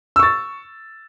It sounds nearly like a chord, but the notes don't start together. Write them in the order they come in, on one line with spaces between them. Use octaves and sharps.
E6 C#6 A6